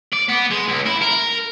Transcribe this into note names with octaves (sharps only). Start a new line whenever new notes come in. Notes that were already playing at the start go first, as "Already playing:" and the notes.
D5
B3
G#3
C#2
E4
A#4